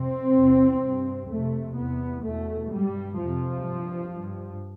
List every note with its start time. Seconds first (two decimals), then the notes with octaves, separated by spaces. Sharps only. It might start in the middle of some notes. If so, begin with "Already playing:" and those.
Already playing: F2 C3 C4
0.35 E2 C3
0.82 G2
1.29 F2 C3 A3
1.77 E2 C3 B3
2.24 E2 B2 A3
2.71 G2 G3
3.18 F2 C3 F3
3.66 G2
4.13 G2